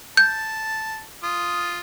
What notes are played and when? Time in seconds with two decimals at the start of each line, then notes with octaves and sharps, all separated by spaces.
0.17 A5 G6
1.23 F4 D#6